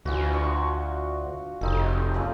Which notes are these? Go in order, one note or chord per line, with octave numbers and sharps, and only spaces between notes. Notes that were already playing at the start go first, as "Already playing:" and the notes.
D2 E3 F4 F#4
D4 C6 C#6
F1 C4 D#4 A4
A#2 C#3 A3